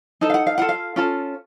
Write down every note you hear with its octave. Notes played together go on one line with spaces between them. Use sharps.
D#4 A4 A5
F5
F#5
F5
F4 A4 F#5
F5
C#4 F4 A4